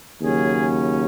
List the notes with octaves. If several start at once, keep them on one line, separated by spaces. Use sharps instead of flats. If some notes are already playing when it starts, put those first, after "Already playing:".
D#2 C#3 F#3 C#4 G#4